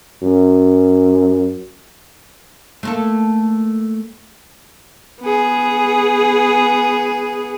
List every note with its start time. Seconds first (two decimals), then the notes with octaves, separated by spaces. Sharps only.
0.22 F#2
2.83 A3 A#3 A4
5.21 B3 G#4